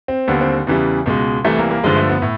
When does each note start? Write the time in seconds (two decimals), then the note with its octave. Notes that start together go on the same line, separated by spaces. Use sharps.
0.08 C4
0.28 D#2 D3 G3 B3
0.41 C4
0.67 E2 C#3 E3 G3
1.06 C#2 B2 G#3
1.44 C2 C3 E3 G3 A3
1.58 A#3
1.71 A#3
1.84 G2 D3 F3 G#3
1.96 A3
2.10 B3
2.22 A2